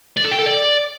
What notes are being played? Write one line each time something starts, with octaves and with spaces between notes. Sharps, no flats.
D5
A4
G5
A4
D5